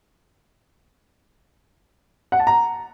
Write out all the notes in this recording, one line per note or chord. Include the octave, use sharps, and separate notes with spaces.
F#5
A5
A#5